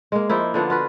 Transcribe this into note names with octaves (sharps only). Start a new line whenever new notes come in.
G#3 A#3
F3 A#3 D#4 E4
D3 F3 B3 D4
F4 F#4 B4